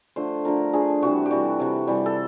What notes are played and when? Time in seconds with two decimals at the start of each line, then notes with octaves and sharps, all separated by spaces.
0.16 D3 F3 A3 C5
0.45 D3 F3 A3 A#4
0.73 D3 F3 A3 G#4
1.02 C3 E3 G3 F#4
1.26 G4
1.31 C3 E3 G3 F#4
1.60 C3 E3 G3
1.87 C3 E3 G3
2.06 A4